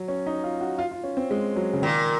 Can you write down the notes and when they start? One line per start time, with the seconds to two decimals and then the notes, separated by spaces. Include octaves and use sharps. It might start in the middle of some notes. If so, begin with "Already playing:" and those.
Already playing: F#3
0.08 C#4
0.27 D#4
0.44 F4
0.61 F#4
0.78 F4
0.91 F4
1.04 C#4
1.17 C4
1.31 G#3
1.56 F#3
1.73 C#3
1.82 A#2 D#3